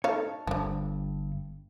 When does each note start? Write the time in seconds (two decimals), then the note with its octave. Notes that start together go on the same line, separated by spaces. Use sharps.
0.04 D#4 A4 C#5 F5
0.47 G1 G2 F3 D4